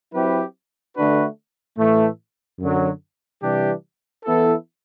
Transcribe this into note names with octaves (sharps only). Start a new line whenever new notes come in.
F#3 C4 E4 G4 B4
D3 A3 D4 F#4 B4
A2 E3 A3
F#2 D3 F#3
C3 E3 G3 D4 G4
E3 B3 E4 A4